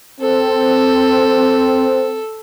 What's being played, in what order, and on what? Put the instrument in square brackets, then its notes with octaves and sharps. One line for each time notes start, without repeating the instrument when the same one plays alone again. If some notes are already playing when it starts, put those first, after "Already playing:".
[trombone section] C4 [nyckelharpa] A4